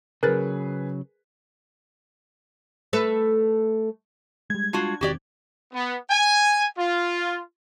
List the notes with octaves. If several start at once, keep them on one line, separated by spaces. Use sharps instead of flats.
C#3 F#3 G#4 A#4 B4 F#6 A6
A3 A4 B4
G3 G#3 G#6
D4 F4 F#4
E1 D#3 C4 F#4 G4 D5
B3
G#5
F4